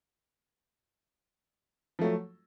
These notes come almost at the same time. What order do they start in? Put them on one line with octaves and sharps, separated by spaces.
F3 A3 F#3